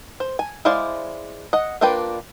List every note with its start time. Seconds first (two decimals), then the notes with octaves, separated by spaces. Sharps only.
0.20 C5
0.39 G#5
0.65 G#3 E4 C5 D5 F5
1.53 D#5 F#5
1.81 A#3 D4 F4 B4 G5